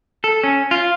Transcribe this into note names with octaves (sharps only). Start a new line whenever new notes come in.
A4
C#4
F4